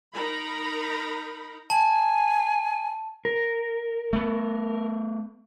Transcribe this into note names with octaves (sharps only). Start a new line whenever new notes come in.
D#4 A#4 A#5 B5
G#5 A5
A#4
A3 B3